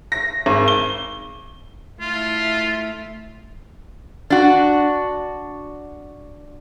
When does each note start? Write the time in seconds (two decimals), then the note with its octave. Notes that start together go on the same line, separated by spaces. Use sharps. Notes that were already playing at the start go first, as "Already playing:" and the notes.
0.12 A#6
0.46 G#1
0.68 G7
2.01 A3 E4 F4
4.30 D4 F#4